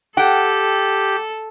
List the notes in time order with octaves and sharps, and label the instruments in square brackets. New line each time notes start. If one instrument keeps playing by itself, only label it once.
[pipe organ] G4 [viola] A4 [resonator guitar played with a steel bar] F#5 G5